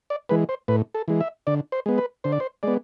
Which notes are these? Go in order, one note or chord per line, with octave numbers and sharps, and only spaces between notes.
D5
E3 G#3 B4
C5
A2 B4
A4
E3 G#3
E5
D3 D5
C5
G#3 B3
B4
D3 C5
D5
C5
G#3 B3 D5